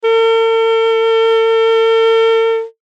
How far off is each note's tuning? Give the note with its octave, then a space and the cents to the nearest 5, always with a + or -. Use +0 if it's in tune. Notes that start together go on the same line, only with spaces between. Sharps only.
A4 +45